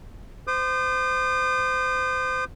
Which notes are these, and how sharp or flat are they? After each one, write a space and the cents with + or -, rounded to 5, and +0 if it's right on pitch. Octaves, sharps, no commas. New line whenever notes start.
C5 -30 D#6 -45